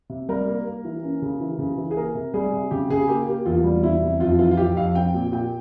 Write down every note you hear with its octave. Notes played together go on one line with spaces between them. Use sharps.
C3
G3 A#4
A#3
A#3
E3
C#4
C#3
E3
C#3
E3
G#4
A#3 A#4
C3
G3 G#4
C3
C#3 G4
C#3 G#4
A#3 G4
A#3 G4
E2 F4
G3
E2 E4
C3
F2 F4
E3 F4
F4
F2 G4
F2 F5
C4 G5
A#2
A#2 G5